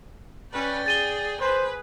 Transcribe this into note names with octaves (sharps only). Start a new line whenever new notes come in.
C#4 B4 D5 G5
G#4 A6 D#7 G7
G#4 B4 C5